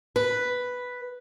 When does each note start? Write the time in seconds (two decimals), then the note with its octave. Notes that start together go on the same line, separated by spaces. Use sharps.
0.16 B4